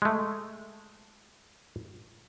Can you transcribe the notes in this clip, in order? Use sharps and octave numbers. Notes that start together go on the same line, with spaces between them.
G#3 A3